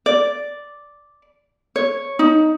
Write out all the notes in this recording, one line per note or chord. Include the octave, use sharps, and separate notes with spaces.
D5
C#5
D#4